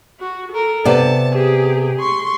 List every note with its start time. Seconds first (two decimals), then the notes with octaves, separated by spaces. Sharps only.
0.20 F#4
0.52 A4 A#4
0.85 C3 B3 D5 A5
1.34 G4 G#4
2.00 C6 C#6